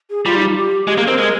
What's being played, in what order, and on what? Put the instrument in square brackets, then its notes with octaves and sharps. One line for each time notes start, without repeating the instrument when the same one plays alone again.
[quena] G#4
[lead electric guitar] G3 [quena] F4
[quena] D#4
F4
G4
[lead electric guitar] G#3 [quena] G4
[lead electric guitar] A#3 [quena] G#4
[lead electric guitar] C4 [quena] A#4
[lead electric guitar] G#3